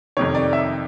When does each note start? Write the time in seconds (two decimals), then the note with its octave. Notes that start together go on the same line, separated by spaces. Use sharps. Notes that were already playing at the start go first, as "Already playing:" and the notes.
0.17 F2 C3 D#3 C#5
0.35 D5
0.53 E5